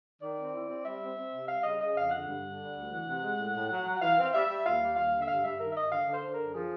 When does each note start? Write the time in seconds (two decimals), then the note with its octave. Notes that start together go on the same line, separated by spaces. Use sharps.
0.21 D#3 D5
0.37 C4
0.53 E4
0.69 C4
0.85 G3 E5
1.01 C4
1.17 C4
1.32 C3
1.48 G3 F5
1.64 C#3 D#5
1.80 C#3 D#5
1.96 F2 F5
2.11 D3 F#5
2.27 G2
2.43 D3
2.59 G3
2.75 D2
2.91 E3
3.06 C3
3.23 G#3
3.38 A2
3.54 A2
3.70 F#3
3.85 F#3
3.95 F#5
4.01 E3 F5
4.17 C4
4.22 F5
4.33 G3 E5
4.49 G3
4.65 D#2 F5
4.81 G3
4.96 D#2 F5
5.13 D3
5.21 E5
5.28 G2 F5
5.44 G2 E5
5.60 D#3 A#4
5.71 E5
5.75 G2 D#5
5.91 D3 F5
6.07 D3
6.13 C5
6.23 D3
6.34 F#2 A#4
6.54 F3 G#4